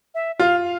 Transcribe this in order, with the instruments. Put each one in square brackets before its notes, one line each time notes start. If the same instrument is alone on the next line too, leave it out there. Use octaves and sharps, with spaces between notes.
[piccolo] E5
[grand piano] F4 [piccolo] F5
[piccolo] F5